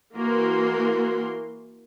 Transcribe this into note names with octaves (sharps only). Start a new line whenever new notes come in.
E3 A#3 F#4 A#4 C6